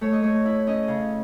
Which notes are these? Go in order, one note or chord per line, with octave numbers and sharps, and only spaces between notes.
A3 C#5
D#5
A3 C#5
E4
C#4 D#5
C#3